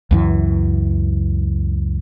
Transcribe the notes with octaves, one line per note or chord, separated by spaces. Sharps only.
C#2 F#2 E3